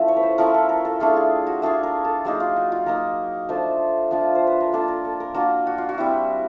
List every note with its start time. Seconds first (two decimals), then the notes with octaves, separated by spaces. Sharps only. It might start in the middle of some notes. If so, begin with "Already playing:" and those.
Already playing: F3 A3 C#4 E4
0.08 C#5
0.17 B4
0.23 C5
0.38 F3 A3 C#4 E4 A#4
0.54 A4
0.69 A#4
0.85 A4
1.00 A3 D4 F4 G#4
1.16 G#4
1.47 F#4
1.62 A3 D4 F4 G#4
1.83 A#4
2.05 A4
2.25 F#3 A#3 D#4 G#4
2.40 F4
2.56 F#4
2.72 F4
2.86 F#3 A#3 D#4 A#4
3.49 F3 A3 D4 F4 C5
4.11 F3 A3 D4 F4
4.35 C5
4.47 B4
4.60 A#4
4.72 A#3 D4 F4 A4
4.88 A#4
5.05 A4
5.20 A#4
5.34 A#3 D4 F4 F#4
5.67 F#4
5.78 F4
5.89 F#4
5.98 G3 C4 E4